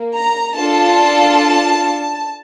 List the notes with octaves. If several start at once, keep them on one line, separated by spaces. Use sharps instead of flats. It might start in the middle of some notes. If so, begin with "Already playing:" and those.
Already playing: A#3
A#5
D4 F4 A4 A5